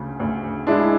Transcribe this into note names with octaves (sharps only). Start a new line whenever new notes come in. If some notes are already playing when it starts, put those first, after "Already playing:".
Already playing: D2 C#3
D2
G#3 D4 E4